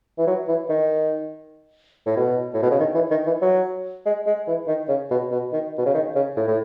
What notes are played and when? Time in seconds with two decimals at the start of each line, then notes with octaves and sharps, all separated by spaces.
0.19 E3
0.27 F#3
0.49 E3
0.69 D#3
2.07 A2
2.17 B2
2.54 A2
2.62 B2
2.71 C#3
2.79 D#3
2.95 E3
3.11 D#3
3.27 E3
3.42 F#3
4.06 G#3
4.26 G#3
4.48 E3
4.68 D#3
4.89 C#3
5.11 B2
5.32 B2
5.53 D#3
5.78 B2
5.86 C#3
5.94 D#3
6.15 C#3
6.37 A2
6.47 A2